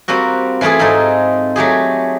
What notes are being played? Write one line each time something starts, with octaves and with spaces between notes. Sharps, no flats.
G3 A#3 C4 F#4
E3 G3 A3 F4 G#4
G#2 C4 D#4 A4
F#3 A3 G4 G#4